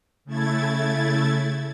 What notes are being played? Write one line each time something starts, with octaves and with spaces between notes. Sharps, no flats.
C#3 A3 E4 G#6 A6